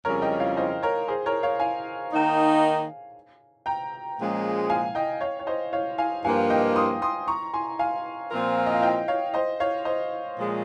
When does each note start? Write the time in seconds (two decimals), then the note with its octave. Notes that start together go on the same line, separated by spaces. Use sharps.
0.05 F2 C#3 G3 C#4 G#4 A#4 C#5
0.22 D#5 G5
0.39 C#5 F5
0.57 C5 D#5
0.83 A#4 C#5
1.08 G#4 C5
1.26 A#4 C#5
1.43 C#5 F5
1.60 F5 G#5
2.11 D#3 A#3 D#4
3.66 G5 A#5
4.18 A#2 F3 G#3 C#4
4.70 F5 G#5
4.95 D#5 G5
5.21 C#5 F5
5.39 C#5
5.47 C5 D#5
5.73 C#5 F5
5.98 F5 G#5
6.24 G2 F3 A#3 F4 F5 G#5
6.50 D#5 G5
6.76 C6 D#6
7.02 C6 D#6
7.28 A#5 C#6
7.54 G#5 C6
7.79 F5 G#5
8.31 A#2 F3 C4 F4 A#4
8.66 D#5
8.74 F5
8.82 D#5 G5
9.08 C#5 F5
9.34 C5 D#5
9.60 C#5 F5
9.85 C5 D#5
10.37 A#2 F3 G#3